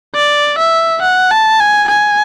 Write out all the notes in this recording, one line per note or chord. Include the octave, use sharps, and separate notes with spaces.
D5
E5
F#5
A5
G#5
G#5